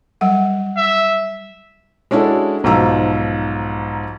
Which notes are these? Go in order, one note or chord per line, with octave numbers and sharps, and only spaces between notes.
F#3 G3 F#5
E5
G#3 C#4 D4 E4 F#4 A4
B1 G#2 F3 F4 A#5 E6